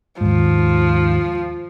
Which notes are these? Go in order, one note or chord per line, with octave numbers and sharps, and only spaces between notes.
D#2 G#2 F3